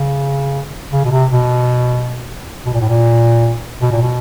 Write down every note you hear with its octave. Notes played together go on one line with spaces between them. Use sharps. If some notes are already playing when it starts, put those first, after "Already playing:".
Already playing: C#3
C#3
B2
C3
B2
B2
A#2
A2
A#2
B2
A#2
B2